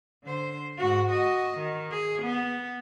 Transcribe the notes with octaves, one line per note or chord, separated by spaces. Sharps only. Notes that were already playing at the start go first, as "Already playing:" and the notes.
D3 C5
G#2 F#4
F#4 D#5
D#3
G#4
B3